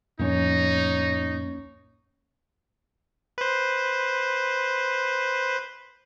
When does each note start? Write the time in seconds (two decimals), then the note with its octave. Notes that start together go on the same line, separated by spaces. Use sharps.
0.20 F2 A2 F3 A#3 C#4 D#4 C#5
3.38 B4 C5